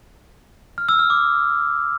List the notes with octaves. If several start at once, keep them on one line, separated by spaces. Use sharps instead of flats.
F6
E6
F6
D6